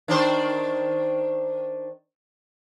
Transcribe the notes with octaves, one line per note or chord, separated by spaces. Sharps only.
D#3 D4 C5